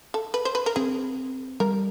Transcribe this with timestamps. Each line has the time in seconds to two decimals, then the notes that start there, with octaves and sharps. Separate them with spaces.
0.14 A4
0.34 B4
0.45 C5
0.55 B4
0.66 A#4
0.76 C4 G#4
1.60 G3 A#4